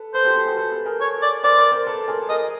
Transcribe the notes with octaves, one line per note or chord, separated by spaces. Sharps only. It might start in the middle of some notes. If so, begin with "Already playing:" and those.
Already playing: A4 B4
A4 B4 C5
G4 A4
G4 A4
F#4 G#4
A4 B4
A4 B4
G#4 A#4
C#5
D5
A#4 C5 D5
A#4 C5
A#4 C5
A4 B4
G#4 A#4
G#4 A#4 D#5